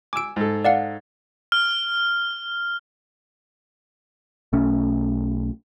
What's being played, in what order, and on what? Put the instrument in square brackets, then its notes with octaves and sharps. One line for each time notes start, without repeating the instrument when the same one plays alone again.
[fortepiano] G#5 E6 [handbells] D6 D7
[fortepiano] G#2 A4
[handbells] D5 F5 F#5
[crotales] F6
[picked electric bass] B1 A3 C#4